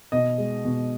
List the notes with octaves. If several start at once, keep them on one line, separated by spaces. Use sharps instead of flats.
B2 D#5
G#3
B2